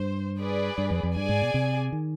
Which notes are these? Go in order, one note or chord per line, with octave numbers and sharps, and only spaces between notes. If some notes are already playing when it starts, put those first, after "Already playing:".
Already playing: G2 C5
G#4 B4 D5
G2
F2
F2
G2 G#4 D5 G#5
G#2
B2
C3
D#3